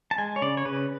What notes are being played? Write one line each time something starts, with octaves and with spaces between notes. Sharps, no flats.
A5
G#3 G#5
C#5
C#3 D5
C#5
C#3 B4